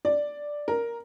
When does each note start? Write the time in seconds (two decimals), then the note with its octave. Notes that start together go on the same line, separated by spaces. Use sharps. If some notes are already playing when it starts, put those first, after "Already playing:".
0.05 D5
0.68 A#4